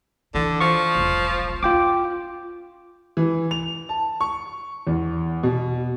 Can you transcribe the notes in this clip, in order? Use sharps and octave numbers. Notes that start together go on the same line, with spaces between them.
D3 E3
F3 C#6
E1 B1
C#4 F4 G5 D6
E3
F7
A5
C#6
E2
B2